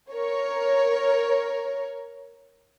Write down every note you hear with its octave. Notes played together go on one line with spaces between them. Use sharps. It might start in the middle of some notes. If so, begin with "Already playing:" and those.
A#4 C#5